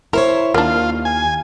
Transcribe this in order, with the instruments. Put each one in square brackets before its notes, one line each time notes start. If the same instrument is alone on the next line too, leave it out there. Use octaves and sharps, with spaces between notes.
[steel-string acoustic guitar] E4 C5 C#5 [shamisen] A#4
[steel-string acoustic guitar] D#2 [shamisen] A#3 D4 [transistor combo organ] F4
[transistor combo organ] G#5